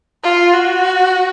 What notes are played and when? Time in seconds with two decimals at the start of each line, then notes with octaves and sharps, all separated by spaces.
0.24 F4
0.53 F#4